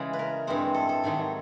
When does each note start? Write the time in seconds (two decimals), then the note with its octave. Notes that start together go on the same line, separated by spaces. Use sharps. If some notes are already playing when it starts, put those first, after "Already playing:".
Already playing: C#3 E3 G#3
0.13 B4
0.19 A#4
0.47 G2 E3 G#3 C4
0.74 A4
0.89 A4
1.03 G#2 D#3 F#3